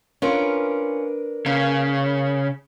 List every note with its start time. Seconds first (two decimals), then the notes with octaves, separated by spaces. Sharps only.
0.22 C#4 D4 F4 A#4 B4
1.46 C#3 A#3